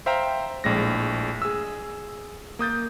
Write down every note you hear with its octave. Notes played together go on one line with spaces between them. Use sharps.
C5 E5 F5 G5 A#5
A#1 A2 G#3 A#6
G#4 E6
A#3 D#6 G6 A6